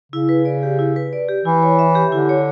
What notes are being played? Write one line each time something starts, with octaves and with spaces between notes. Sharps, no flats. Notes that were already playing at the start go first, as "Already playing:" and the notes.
C#3 E4
B4
D5
G4
E4
B4
D5
G4
E3 E4
C#5
E5
G4
D3 E4
C#5